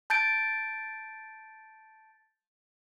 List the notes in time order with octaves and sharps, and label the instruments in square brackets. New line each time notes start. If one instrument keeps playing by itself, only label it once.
[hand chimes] A5 G6 A6 D7